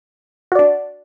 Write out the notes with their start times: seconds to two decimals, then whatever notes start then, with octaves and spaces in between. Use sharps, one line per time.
0.52 F#4
0.55 D5
0.59 D4